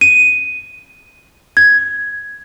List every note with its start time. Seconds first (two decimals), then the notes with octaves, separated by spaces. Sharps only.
0.01 D#7
1.57 G#6